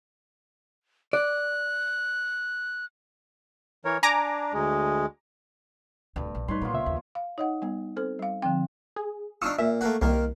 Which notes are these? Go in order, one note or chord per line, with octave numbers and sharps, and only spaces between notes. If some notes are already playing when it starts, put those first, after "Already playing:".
D5 F#6
E3 A#4 C#5
D4 G#5 A#5 D6
D2 G#3
D1 D2 G2
A#1
A2 G3 D#4 B4 C#5 C6
A#2 A#3 B3 F4
C#2 E5
D#2
F5
D#4 C#5 D#5 F#5
G3 B3
C4 A4 C5
G3 F5
D3 F3 C4 G5
G#4
D4 D#4 F4 C#6 D#6 E6
A#2 E5
A3 A#3 F#4
C2 D#3 A#3